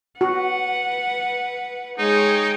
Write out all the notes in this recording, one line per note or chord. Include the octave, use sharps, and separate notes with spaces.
F#4 B4 F#5
G#3 D#4 C#5 G5